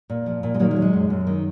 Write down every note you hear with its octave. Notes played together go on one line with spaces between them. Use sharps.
A#2
F3
A#2
G#3
D#3 F#3 A#3
G#3
F#3
G#3
F#2
F#2
D#3